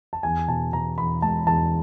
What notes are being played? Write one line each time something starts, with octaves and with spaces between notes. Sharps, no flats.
A5
E2 G#5
B2 A5
B2 A#5
E2 B5
G#3 A5
E2 A5